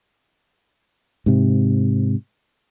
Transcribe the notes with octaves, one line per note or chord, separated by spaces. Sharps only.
G#2 C3